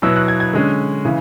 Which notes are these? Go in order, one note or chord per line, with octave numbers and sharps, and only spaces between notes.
B2 F#3 B3 E4 E6
F#6
G#6
G#6
D3 G#3 C#4
C#3 E3